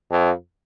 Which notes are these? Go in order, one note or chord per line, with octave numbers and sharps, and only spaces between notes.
F2